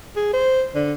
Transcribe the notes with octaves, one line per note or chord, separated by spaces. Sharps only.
G#4
C5
D3